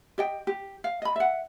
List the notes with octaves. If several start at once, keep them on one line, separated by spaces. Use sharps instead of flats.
G4 D#5 G5
G4
F5
D#5 B5
E5 F#5